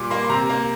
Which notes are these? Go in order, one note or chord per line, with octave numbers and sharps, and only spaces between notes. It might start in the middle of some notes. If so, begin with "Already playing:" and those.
Already playing: A#2 G3 D6
A#3 C6
C6
C3 A#5
A#3